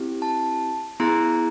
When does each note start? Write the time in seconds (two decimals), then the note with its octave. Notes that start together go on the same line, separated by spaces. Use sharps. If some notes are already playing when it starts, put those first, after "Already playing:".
Already playing: C4 E4 G4
0.22 A5
1.00 B3 E4 G#4 A#5